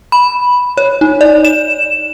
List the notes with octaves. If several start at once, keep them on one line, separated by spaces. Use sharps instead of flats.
B5
C#5
D#4
D5
E7